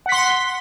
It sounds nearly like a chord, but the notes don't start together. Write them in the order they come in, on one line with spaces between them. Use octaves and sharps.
F#5 B6 C6